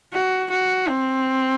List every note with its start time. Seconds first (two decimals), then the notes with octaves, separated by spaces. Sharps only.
0.13 F#4
0.50 F#4
0.88 C4